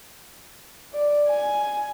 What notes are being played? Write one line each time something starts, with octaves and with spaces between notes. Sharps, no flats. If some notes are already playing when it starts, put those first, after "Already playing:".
D5
G#5